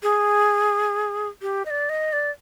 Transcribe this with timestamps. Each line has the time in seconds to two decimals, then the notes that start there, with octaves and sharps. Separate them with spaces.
0.03 G#4
1.42 G4
1.66 D#5
1.70 D5
1.89 D#5
2.13 D5